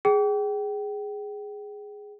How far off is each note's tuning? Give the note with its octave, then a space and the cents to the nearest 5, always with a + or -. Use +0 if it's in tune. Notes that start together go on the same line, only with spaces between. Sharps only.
G#4 +0 G5 -30